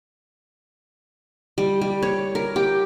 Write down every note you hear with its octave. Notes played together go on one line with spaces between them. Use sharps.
G3
G3
C#5
A#4
G4